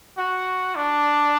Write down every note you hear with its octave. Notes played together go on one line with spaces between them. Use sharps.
F#4
D4